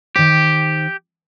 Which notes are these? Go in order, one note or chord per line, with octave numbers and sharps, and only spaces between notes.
D#3 G4 C5